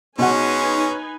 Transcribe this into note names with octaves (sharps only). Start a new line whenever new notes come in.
B2 G#3 C#4 D#4 B4 F#5 G#5